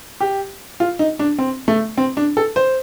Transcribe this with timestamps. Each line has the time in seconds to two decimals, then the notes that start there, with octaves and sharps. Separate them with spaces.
0.20 G4
0.80 F4
0.99 D#4
1.19 D4
1.39 C4
1.68 A3
1.97 C4
2.17 D4
2.37 A4
2.56 C5